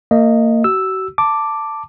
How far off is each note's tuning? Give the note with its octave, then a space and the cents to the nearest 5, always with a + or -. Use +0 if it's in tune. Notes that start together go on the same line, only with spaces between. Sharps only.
A#3 -30 D#5 +0
F#4 +40 E6 +0
A5 +10 D6 +0